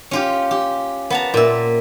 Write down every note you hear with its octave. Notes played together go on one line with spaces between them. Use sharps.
C#4 F4 G4
G4
B3 A5 A#5
A#2 E5